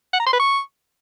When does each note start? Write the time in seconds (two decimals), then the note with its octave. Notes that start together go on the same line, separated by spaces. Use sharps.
0.13 F#5
0.20 A#5
0.26 C6
0.33 B4
0.39 C#6